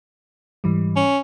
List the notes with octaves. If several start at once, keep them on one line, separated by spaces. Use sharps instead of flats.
G#2 E3 G3
C#4